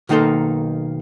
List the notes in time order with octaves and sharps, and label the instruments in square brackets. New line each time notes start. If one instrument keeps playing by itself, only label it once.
[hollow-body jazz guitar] B1 D#3 A#3 D#4 A4 C6